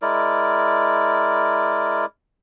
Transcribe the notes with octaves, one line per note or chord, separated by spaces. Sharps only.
G#3 E4 A#4 D5